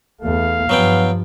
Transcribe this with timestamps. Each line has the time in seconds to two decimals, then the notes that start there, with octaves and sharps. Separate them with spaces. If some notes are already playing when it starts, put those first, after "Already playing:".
0.21 E2 A3 F5
0.69 G2 F3 F#3 B3 G5